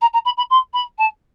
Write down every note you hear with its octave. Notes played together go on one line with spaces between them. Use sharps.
A#5
A#5
B5
B5
C6
B5
A5